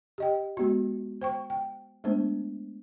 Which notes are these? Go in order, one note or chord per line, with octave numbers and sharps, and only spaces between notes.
G4 D#5 G5
G#3 B3 F#4
C5 G5 C#6
G5
G#3 A3 B3 D4 C5